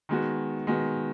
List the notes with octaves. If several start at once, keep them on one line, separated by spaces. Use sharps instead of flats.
D#3 G#3 B3 F#4
D#3 G#3 B3 F#4